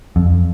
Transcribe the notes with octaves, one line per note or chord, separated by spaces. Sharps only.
F2